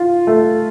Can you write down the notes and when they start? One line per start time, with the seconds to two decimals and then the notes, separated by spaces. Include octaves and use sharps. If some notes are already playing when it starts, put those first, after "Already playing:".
Already playing: F4
0.27 A3